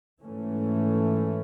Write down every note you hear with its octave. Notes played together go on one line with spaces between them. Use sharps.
G#2 E3 A3 C#4